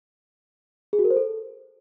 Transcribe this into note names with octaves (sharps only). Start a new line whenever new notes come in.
G#4
F#4
A#4
C5
A4